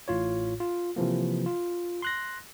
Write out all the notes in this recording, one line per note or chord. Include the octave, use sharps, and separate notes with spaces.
A1 A2 F4 C#5
F4
C3 E3 F3 A#3
F4
C6 F#6 A#6